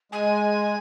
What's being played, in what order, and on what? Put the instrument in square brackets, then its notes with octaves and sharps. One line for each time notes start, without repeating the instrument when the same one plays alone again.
[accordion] G#3 [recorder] G#5